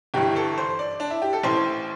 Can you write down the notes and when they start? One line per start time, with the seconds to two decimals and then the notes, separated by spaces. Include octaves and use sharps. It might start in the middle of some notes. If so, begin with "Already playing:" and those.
0.14 G1 G2 E3 G4
0.36 A4
0.58 C5
0.79 D5
1.00 D4
1.10 E4
1.22 G4
1.33 A4
1.43 A1 A2 E3 C5